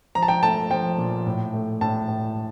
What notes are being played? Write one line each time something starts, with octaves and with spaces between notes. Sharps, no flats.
F3 A#5
A5
G5
A3 A5
F3 G5
A#2
A2
A3
A2 A5
A2